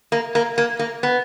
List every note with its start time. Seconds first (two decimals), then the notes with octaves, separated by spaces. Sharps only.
0.12 A#3
0.35 A#3
0.58 A#3
0.79 A#3
1.03 B3